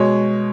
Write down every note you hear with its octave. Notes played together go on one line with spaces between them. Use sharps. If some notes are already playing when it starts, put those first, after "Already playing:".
Already playing: B2 G#3 C#5